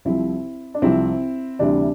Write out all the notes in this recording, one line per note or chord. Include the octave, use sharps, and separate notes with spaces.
C2 C3 F3 C4 E4
D4
C2 C3 F3 C4 E4
D2 C3 E3 G3 D4